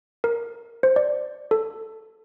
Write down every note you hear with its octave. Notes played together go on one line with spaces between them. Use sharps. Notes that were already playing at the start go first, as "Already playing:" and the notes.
A#4
C5
D5
A4